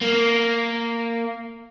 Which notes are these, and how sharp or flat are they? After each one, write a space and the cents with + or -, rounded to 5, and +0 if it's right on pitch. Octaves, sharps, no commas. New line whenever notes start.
A#3 -10